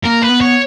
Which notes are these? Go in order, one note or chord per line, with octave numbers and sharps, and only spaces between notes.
A#3 A#4
B4
B3
C#5